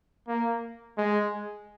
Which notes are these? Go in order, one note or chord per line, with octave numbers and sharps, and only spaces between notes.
A#3
G#3